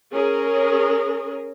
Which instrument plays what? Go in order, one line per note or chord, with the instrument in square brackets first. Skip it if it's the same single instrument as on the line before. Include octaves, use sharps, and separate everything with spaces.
[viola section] C#4 G#4 A#4